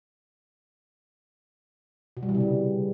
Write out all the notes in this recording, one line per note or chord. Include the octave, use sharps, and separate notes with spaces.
B2
G3
E3
C3
C#3